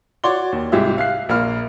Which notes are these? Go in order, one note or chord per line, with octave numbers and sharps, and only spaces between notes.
F#4 C#5 D5 C6 G7
D#2
C2 G#2 G4 G#4 E5
E5 F5 F#6 C7
A#1 A#3 B5 F6